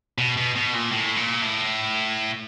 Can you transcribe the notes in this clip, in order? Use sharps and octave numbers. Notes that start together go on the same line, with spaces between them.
B2
B2
B2
A#2
A2
A#2
A2